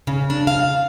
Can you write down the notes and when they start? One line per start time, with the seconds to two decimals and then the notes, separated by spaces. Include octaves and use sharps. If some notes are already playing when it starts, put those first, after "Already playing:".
0.07 C#3
0.30 D4
0.47 F5